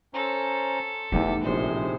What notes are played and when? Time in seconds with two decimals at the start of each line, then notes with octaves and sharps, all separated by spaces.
0.14 C#4 A4 C5 A#5
1.12 E2 A3 D#4 G4
1.44 A#1 A2 C3 G#3 C5